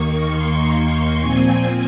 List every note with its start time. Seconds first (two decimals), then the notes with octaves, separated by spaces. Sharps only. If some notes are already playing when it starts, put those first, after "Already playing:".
Already playing: D#2 D#3 A#3 C#6
0.28 C6
0.74 C6
1.19 A#2 F3 C4 G#5